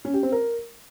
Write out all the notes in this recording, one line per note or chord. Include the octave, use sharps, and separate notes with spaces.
C#4
G4
C4
A#4